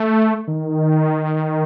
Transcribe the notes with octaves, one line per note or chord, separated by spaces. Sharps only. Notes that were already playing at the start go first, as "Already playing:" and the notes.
Already playing: A3
D#3